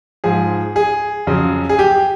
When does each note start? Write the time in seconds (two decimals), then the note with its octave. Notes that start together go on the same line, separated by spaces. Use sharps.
0.24 G#2 F3 G#4
0.76 G#4
1.27 F2 C#3 F#3
1.69 G#4
1.79 G4